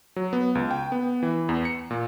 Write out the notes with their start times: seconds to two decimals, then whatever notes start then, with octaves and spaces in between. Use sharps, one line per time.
0.16 F#3
0.33 B3
0.55 C#2
0.71 G5
0.92 B3
1.23 E3
1.49 E2
1.65 C#7
1.91 A#2